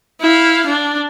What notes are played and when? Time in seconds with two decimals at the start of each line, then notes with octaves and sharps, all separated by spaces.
0.21 E4 F5
0.66 D4